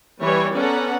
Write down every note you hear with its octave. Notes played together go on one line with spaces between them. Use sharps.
E3 G3 E4 C#5
B3 C#4 A4 D5 F#5 A#5